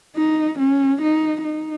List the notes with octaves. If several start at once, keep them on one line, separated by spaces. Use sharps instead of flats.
D#4
C#4
D#4
D#4